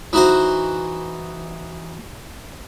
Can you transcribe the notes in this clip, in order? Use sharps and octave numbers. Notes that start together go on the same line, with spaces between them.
E3 D#4 F#4 C5